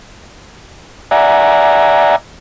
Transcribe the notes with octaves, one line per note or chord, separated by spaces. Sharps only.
D5 E5 F#5 G#5 A#5